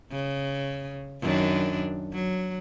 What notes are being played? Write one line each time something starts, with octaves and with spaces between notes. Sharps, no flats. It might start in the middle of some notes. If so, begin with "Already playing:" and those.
C#3
F#2 D#3 D4
F#3